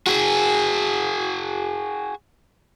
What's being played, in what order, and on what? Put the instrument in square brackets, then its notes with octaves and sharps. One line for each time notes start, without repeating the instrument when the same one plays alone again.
[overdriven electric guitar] F#4 G#4